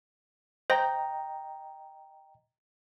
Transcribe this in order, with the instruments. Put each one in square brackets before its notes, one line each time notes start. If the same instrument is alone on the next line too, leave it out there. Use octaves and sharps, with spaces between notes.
[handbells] C5 A#6 [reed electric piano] D#5 G5 A#5